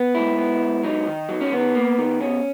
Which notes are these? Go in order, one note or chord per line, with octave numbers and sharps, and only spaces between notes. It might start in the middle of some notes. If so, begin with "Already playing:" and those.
Already playing: B3
G#2 E4
B3
G#2
F#3 D#4
D#3
F#3
C#4
D#3 B3
A#3
D#3
B2 C#4